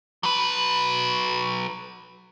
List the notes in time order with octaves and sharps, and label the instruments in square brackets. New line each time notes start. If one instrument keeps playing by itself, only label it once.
[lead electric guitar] F#3 B4